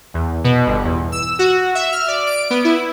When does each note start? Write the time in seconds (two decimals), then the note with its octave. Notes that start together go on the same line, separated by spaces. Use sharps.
0.14 E2
0.44 B2
0.67 G1
0.84 E2
1.12 E6
1.39 F#4
1.75 E5
1.92 F6
2.08 D5
2.27 D7
2.50 B3
2.64 E4